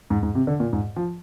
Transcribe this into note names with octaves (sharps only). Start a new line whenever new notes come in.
G#2
G#2
C3
D3
A#2
G#2
F3